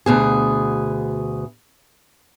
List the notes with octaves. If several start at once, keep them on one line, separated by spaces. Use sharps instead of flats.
D2 B2 G#4